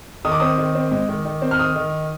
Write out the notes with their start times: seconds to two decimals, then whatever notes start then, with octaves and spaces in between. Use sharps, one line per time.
0.25 D#3 D#6
0.32 D6
0.40 C4 D#6
0.58 D#3
0.75 C4
0.91 G#3
1.09 D#3
1.25 D#3
1.42 C4
1.51 F6
1.59 D#3 D#6
1.76 D#3